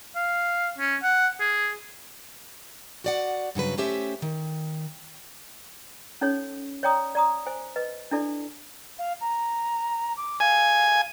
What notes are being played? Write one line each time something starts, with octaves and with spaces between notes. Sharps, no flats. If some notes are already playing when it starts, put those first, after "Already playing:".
F5
C#4
F#5
G#4
F#4 D5 F#5
G2 C#3 F#3 B4
A3 C#4 G4 C5 E5
D#3
C#4 D#4 A4 C#5
C#5 D5 G5 A#5 D#6
D5 A#5 D#6
C5 G#5
B4 D#5
D4 E4 A4 D5
F5
A#5
D6
F5 G#5